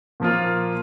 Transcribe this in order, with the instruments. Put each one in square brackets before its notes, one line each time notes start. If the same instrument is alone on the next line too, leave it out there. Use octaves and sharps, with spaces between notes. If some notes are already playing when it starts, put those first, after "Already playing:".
[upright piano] A#2 F3 A#3 F4